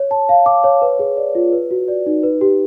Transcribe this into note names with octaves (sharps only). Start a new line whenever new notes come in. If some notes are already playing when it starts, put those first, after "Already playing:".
Already playing: C#5
A5
F5
D6
C#5
B4
G#4
D5
F4
B4
F#4
D5
D#4
B4
G4